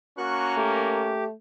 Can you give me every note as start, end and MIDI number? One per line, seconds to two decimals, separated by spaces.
0.18 1.17 58
0.18 1.17 61
0.18 0.55 66
0.18 1.17 70
0.18 0.55 85
0.18 0.55 90
0.57 1.32 57
0.57 1.24 67